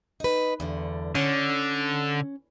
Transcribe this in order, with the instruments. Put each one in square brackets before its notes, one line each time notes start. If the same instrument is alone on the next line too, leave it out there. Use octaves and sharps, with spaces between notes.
[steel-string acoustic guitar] D#4 B4
E2 G2 D3
[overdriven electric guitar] D3 [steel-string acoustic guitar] C#4